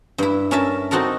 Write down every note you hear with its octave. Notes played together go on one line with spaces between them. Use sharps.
G2 E4
C#4 A#4 E5 A5
C4 D#4 F#4 A4 A#4